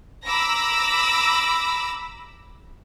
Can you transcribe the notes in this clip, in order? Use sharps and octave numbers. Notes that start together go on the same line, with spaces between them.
A#5 B5 D6 E6 A#6